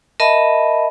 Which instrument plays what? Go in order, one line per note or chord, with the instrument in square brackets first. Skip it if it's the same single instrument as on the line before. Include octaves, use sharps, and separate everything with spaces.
[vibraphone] A#4 D#5 E5 A5 B5